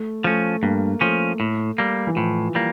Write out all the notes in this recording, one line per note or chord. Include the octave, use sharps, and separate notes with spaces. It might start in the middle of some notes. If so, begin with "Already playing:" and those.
Already playing: A3
F3 A3 C#4
G2 A#3
F3 A3 C#4
A2
G3 A#3
E3
A2 F3
G3 A#3